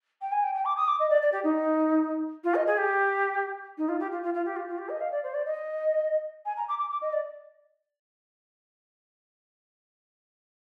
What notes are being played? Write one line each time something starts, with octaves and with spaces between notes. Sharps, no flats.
G5
G#5
G5
G5
D6
D#6
D6
D#5
D5
D5
G4
D#4
F4
D#5
G#4
G4
D#4
F4
G4
F4
F4
F4
G4
F4
F4
G4
D#5
F5
D5
C5
D5
D#5
G#5
A#5
D6
D6
D6
D#5
D5